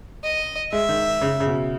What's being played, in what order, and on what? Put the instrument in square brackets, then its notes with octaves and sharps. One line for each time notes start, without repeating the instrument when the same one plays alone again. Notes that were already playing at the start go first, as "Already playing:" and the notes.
[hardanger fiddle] D#5
[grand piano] G#3 [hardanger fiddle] E5
[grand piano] D#3
C#3
C#3
B2